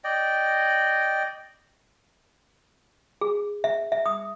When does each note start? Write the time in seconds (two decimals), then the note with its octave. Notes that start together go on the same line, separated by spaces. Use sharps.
0.04 D5 D#5 G5
3.21 G#4
3.64 E5
3.92 E5
4.06 D#6